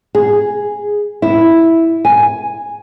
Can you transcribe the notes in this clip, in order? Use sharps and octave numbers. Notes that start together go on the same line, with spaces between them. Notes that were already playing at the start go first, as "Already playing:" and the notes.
G#4
E4
G#5